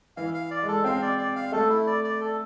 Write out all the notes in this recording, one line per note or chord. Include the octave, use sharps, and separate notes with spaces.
E3 F5
F5
D5
G#3
A4
C4 F5
D5
D5
F5
A3 A4
E4
D5
D5
A4